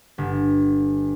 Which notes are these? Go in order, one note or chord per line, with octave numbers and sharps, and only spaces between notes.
G1